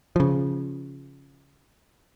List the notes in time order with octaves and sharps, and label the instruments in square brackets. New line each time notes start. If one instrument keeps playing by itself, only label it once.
[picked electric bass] C#3 F3